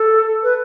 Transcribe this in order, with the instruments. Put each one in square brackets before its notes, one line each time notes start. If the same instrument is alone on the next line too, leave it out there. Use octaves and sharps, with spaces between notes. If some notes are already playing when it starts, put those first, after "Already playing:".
Already playing: [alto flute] A4
B4